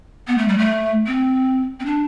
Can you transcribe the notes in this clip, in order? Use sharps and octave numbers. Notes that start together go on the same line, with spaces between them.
B3
A3
G3
A3
C4
C4
D4